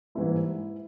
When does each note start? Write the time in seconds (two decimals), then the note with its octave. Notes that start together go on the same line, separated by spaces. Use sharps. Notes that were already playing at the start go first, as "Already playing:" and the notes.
0.15 G#2 E3 G3 A#3 E4